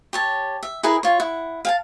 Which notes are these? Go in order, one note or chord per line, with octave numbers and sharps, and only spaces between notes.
G4 C#5 A5
E5
E4 G#4 A#4 B4
F4 C#5
E4 F#5
F5 G#5 A5